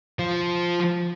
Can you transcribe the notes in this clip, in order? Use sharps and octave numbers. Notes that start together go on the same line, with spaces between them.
F3 F4